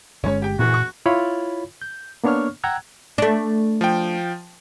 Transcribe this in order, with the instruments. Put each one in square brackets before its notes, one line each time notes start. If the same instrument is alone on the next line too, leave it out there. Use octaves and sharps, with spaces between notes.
[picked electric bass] G1 C#3 G#3 [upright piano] C#4 C#5
[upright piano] G4 G5
[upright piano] F#1 E3 [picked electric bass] A#2 [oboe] F#4
[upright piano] C#6
[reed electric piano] E4 F4 C#5 B5
G6
A#3 B3 D4 C#5 C#6 F6
F#5 G5 A#5 E6 F#6 G#6
[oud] A3 D4
[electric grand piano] F3 G5